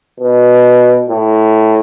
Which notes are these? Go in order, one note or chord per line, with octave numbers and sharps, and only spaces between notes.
B2
A2